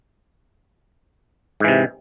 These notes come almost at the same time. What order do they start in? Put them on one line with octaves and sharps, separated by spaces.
G#2 E3 C3